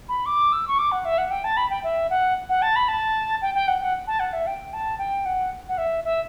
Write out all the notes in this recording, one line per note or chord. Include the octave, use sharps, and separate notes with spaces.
B5
D6
E6
C#6
D6
F#5
E5
F#5
G5
A5
B5
G5
E5
F#5
F#5
A5
B5
A5
G5
G5
F#5
F#5
A5
F#5
E5
G5
A5
G5
F#5
F#5
E5
E5